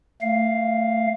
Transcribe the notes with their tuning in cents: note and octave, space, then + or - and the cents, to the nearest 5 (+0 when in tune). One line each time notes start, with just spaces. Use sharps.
A3 +20 F5 +0